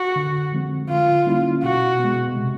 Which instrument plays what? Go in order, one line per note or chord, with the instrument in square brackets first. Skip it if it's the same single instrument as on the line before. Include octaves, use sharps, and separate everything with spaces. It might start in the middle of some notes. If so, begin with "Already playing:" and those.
Already playing: [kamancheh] F#4
[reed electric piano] D3
F3 G#3 C4
[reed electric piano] D3 [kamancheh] F4
[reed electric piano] G3 A#3 C#4 E4
[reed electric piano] B2 [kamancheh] F#4
[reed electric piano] G#3 B3
C3